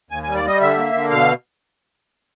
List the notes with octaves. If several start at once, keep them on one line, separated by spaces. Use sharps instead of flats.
D#2 G#5
G#5
G3
D5
G3 D#5
D3 E5
A#3
D3
B2 F5